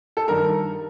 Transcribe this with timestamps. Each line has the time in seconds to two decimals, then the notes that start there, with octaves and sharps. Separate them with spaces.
0.17 A4
0.28 G2 D#3 A#4